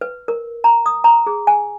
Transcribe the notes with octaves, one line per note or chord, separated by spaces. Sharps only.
B4
A#4
A#5
D#6
A#5
G#4
G#5